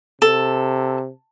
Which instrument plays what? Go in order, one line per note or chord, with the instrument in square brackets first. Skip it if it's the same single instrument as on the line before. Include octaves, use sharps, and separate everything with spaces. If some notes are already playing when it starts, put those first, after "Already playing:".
[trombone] C3 [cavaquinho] A4